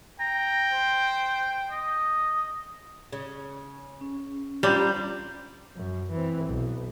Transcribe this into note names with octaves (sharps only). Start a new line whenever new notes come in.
G5 A#5
C5
D#5
C#3
C#4
G3 C4 D4 F4 G4 A#5 G6
F#2
E3 C4
B1